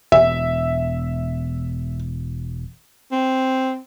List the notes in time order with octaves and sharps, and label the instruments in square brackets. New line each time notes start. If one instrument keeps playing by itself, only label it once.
[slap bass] E1 [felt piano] E5
[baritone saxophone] C4